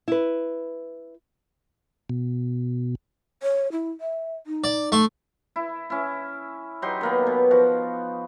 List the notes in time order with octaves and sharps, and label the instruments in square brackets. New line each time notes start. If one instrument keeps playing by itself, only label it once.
[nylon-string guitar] E4 B4
[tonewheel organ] B2
[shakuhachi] C#5
E4
E5
D#4
[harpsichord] D5
A3 C6
[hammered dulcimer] E4
C#4 E4
F#3 D#4 G4 C6
D#3 A#3 B3
B2
F3 F#4